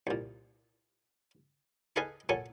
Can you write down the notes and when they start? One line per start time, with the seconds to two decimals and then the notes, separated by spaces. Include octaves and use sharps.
0.07 C2 A#2
1.96 G#4 A4 B4 D#5 F5 G#5
2.29 A#2 F#3 A4 G#5